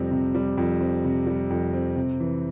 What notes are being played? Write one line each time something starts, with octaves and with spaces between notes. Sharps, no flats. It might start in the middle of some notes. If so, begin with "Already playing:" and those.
Already playing: F2 C3 G3 C4
C3
G3
F2
C4
C3
G3
F2
C4
C3
E3